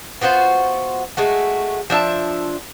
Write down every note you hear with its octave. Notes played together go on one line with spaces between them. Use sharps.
B3 F4 F#4 C5
G#3 A3 F#4
F3 D4 E5 A5